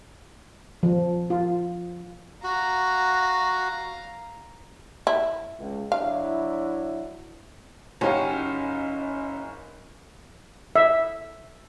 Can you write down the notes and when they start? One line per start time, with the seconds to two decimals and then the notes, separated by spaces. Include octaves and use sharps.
0.83 F3
1.30 F4
2.44 F#4 F5 A#5
5.07 E4
5.58 C#2
5.92 F#3 D4 E4 F5
8.01 F#1 C#4 D#4 F#4 G4 C#5 F5
10.76 E5